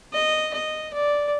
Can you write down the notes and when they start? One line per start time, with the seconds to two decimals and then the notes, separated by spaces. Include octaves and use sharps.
0.13 D#5
0.54 D#5
0.93 D5